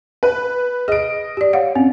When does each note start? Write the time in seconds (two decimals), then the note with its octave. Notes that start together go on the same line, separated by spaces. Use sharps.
0.23 B4
0.88 G#4 D#5 D7
1.37 G4 D5
1.53 C#5 F5 F#5
1.76 C4 C#4